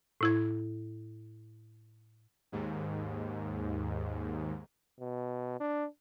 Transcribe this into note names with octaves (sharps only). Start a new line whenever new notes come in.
A2 E4 G#6
D#2 G#2
B2
D4